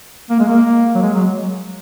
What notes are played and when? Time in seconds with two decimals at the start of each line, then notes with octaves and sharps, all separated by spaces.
0.30 A#3
0.40 G#3
0.48 A#3
0.95 F#3
1.02 G#3
1.14 F#3